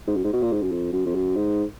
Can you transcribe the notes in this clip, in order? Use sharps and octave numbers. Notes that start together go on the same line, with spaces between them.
G#2
F#2
G#2
B2
A#2
G#2
F#2
F2
F#2
F2
F#2
G#2